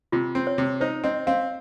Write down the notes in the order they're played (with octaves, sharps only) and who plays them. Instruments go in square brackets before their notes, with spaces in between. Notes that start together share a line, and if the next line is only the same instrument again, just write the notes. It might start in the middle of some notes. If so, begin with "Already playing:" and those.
[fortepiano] C3 [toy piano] F4
[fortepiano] C4
[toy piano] C#5
[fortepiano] C3
[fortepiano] D#4 [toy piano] C5
[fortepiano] C4 [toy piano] D#5
[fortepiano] C4 [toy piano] F5